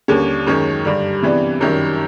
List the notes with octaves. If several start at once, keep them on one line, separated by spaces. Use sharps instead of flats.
D#2 D3 G3 A#3 C#4
F#2 D#3 G#3 C#4
G2 D3 G3
C3 E3 G3 B3 D4
G1 F#2 D#3 G3